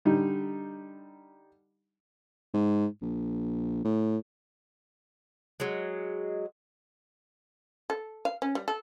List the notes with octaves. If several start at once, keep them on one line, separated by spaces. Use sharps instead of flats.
D3 G3 D#4
G#2
A#1
A2
F#3 G#3
A4
F5
C#4
G3
A4